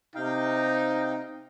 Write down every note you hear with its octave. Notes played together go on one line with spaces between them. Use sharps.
C3 D#4 F5 G5